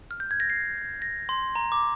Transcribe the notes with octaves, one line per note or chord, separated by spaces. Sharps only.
F6
G6
G#6
A#6
C7
A#6
C6
A#5
D6